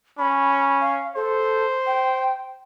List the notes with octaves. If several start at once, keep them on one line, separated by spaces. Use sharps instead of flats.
C#4 B5
F5
A4 C5
G5